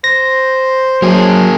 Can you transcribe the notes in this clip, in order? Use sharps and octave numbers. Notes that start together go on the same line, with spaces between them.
C5 A#6
F#3 A#3 G#4